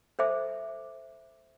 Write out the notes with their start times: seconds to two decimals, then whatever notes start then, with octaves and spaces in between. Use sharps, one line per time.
0.19 A4 C5 E5 D6